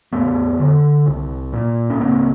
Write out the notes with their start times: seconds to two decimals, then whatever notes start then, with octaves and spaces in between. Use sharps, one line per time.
0.13 F2 A3 B3
0.60 D3
1.07 C2
1.53 A#2
1.90 C#4
1.99 C#2 A#3 C4